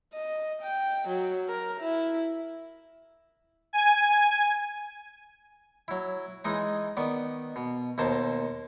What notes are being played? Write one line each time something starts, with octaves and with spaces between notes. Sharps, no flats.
D#5
G5
F#3
A#4
E4
G#5
F#3 E4
E3 G#3 D#4
D#3 B3 D5
B2
D#2 B2 A#3 C5 A5